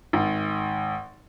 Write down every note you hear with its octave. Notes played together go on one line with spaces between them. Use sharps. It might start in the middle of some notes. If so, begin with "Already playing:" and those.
G#1